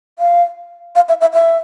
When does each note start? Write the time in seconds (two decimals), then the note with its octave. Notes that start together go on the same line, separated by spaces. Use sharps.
0.19 F5
0.95 F5
1.09 E5
1.21 E5
1.34 E5